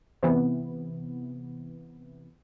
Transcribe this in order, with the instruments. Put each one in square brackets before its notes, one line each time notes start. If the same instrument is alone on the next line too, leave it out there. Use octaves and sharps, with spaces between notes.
[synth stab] C3 E3 B3